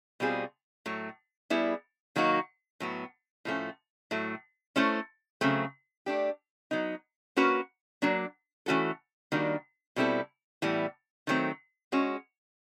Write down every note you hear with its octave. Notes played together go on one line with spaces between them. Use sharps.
B2 G3 C4 F4 G#4
A2 F#3 A3
G3 B3 E4 G#4
D#3 F#3 A#3 D#4 F#4
A2 F#3 B3
A2 F3 A3 C#4
A2 F#3 A3
A3 C#4 E4 A4 C5
C#3 F#3 A3 C4
A3 D4 G4
F#3 B3 D#4
A#3 C#4 F#4 B4
F#3 A#3 D4
E3 A3 C#4 F#4 A4
D#3 G3 A#3 D4 F#4
B2 G3 C4 E4 A4
A2 E3 G3 B3
D#3 F#3 A3 C4
G#3 C#4 F#4